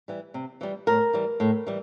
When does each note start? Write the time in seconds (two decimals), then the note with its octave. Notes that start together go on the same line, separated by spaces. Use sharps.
0.08 E3 G3
0.34 C3
0.61 E3 G3
0.87 A2 A#4
1.13 E3 G3
1.40 A2
1.67 E3 G3